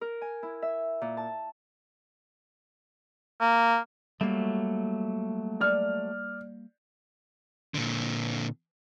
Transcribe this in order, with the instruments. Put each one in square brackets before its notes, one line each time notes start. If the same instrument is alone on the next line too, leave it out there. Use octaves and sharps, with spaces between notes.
[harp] A#4
G#5
E4
E5
A#2
A5
[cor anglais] A#3
[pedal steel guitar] F#3 A3 [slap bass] G3 A#3
[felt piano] D5 F6
[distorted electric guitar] A#2 D3